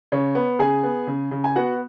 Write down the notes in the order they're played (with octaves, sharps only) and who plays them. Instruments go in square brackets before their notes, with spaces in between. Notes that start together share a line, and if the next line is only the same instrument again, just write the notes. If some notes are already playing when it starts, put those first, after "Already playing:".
[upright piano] C#3 C#5
B3
C#3 G#4 G#5
B3
C#3
C#3
G#5
B3 F#4 F#5